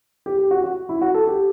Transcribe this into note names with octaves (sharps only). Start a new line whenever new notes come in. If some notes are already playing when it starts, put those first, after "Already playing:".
G4
G4
F#4
F#4
E4
F#4
A4
G4